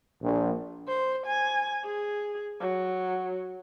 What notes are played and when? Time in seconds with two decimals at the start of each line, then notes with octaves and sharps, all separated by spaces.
0.23 A#1
0.88 C5
1.26 G#5
1.84 G#4
2.61 F#3